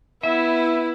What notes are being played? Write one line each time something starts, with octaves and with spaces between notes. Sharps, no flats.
B3 E4 E5